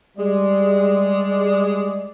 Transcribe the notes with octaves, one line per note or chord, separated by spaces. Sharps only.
G3 G#3 D5